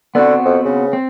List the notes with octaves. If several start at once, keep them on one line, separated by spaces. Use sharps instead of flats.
D3 B3 C4 F#4
F2
C#3
C4